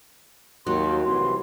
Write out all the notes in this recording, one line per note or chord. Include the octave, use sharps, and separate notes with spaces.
D#2 F#3 C6
C2 E3 C6